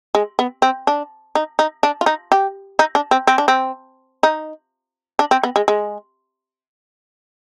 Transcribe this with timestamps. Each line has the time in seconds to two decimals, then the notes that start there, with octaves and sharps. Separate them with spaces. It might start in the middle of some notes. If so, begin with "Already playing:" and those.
0.15 G#3
0.39 B3
0.62 C4
0.87 D4
1.35 D#4
1.59 D#4
1.83 D4
2.01 F4
2.06 D#4
2.32 G4
2.79 D#4
2.95 D4
3.11 C4
3.27 C4
3.38 D4
3.48 C4
4.23 D#4
5.19 D4
5.31 C4
5.43 B3
5.56 G#3
5.68 G#3